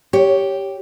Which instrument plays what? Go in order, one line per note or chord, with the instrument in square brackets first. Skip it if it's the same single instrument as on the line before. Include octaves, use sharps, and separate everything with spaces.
[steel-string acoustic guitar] G4 [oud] C#5